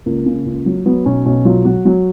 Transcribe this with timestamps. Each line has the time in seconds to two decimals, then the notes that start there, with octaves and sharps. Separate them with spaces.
0.06 C#2 A#3
0.26 C#3
0.46 C#2
0.66 F#3
0.86 F#3 B3
1.06 B1 C#4
1.26 B1 C#4
1.45 F#3 F4
1.65 F#3 F#4
1.85 F#3